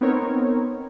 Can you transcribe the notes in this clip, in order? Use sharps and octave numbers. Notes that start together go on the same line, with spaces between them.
B3 C4 D#4 A#4 C#5